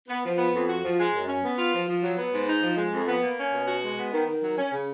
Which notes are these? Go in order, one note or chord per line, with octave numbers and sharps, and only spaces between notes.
B3
F3
B3
F2
F#4
F3
G#3
F#2
C#4
B3
F4
F3
F3
F#3
B3
G#2
D#4
F3
G#3
F2
B3
A#3
C#4
B2
F#4
G#3
B3
D#3
D#3
F#3
C#4
C#3